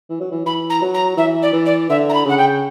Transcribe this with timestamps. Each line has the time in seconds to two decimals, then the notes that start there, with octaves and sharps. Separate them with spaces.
0.10 E3
0.20 F#3
0.31 E3
0.46 E3 B5
0.70 A#5
0.82 F#3
0.94 A#5
1.17 E3 E5
1.42 D5
1.53 E3
1.65 D5
1.89 D3 E5
2.09 A#5
2.14 B5
2.25 C#3 F#5
2.37 G5